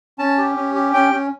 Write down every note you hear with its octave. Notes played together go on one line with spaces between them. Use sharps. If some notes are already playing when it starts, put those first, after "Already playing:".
C#4 A5
G4
C#4
G4
C#4 G5
C#4